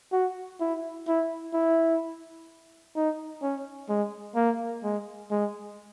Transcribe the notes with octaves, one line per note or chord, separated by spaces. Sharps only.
F#4
E4
E4
E4
D#4
C#4
G#3
A#3
G#3
G#3